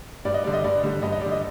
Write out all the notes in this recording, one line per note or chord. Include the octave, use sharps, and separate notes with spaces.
G2 D5
D#5
D3 G3 D5
D#5
G2 D5
D3 G3
G2 D#5
D#5
G3 D5
D3
D#5